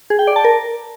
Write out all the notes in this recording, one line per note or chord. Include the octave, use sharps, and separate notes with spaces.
G#4
G5
D5
A5
A#4